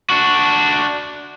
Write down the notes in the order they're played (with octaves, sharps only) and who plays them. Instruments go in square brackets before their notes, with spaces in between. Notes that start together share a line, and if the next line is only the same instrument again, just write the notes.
[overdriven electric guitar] D4 F#4